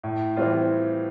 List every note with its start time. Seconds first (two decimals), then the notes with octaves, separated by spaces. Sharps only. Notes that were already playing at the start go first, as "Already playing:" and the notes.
0.03 A2
0.36 E3 G3 C4 F4